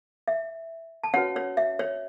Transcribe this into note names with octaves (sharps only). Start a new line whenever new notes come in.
E5
A5
C#4 F#4 B4 C#5 F#5
C#5
E5
C#5